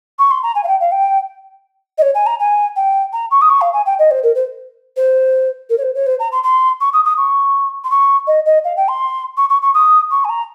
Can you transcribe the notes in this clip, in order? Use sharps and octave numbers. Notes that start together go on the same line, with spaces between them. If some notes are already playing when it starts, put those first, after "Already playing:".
C#6
C6
A#5
G#5
F5
G5
F5
G5
D#5
C#5
G#5
A#5
G#5
G5
A#5
C#6
D#6
C#6
F5
G#5
G5
D#5
C5
A#4
C5
C5
A#4
C#5
C5
C#5
C5
A#5
C6
C6
C#6
D#6
D#6
C#6
C6
C#6
D#5
D#5
F5
G5
C6
C#6
C#6
C#6
D#6
C#6
G#5
A#5